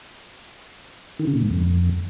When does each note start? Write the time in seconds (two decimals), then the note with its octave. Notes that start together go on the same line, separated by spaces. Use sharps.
1.19 D#3
1.27 C#3
1.35 A#2
1.43 G#2
1.50 F2